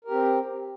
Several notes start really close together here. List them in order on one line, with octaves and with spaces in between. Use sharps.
A#4 G4 C4